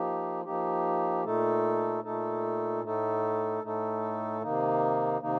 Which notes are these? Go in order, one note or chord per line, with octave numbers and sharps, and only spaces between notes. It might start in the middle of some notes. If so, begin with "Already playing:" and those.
Already playing: F3 A#3 D#4 G4
F3 A#3 D#4 G4
A#2 A3 D#4 A4
A#2 A3 D#4 A4
A2 A3 D#4 A4
A2 A3 D#4 A4
C3 D#3 A#3 D#4
C3 D#3 A#3 D#4